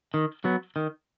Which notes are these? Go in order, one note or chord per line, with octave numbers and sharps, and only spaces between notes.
D#3
F#3 B3
D#3